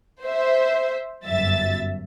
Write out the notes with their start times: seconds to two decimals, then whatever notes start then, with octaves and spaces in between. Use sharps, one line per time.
0.24 C5 E5
1.27 G1 F#2 E5 A6